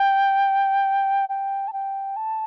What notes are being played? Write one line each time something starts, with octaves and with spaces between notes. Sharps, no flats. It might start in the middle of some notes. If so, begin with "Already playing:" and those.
Already playing: G5
G5
A5
G5
A5